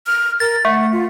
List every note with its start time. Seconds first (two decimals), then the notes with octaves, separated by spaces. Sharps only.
0.07 F6
0.40 A#4 A6
0.65 A3 F#5
0.92 F4